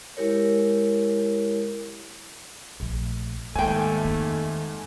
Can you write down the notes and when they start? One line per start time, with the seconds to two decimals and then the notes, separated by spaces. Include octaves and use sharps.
0.17 G#3 E4 G4 A#4 C#5
2.80 A#1 A3
3.56 D#2 G#2 G#3 A3 G5 G#5
4.05 F2 A#3